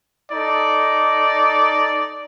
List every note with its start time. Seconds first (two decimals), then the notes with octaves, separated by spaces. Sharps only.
0.32 D#4 A4 D5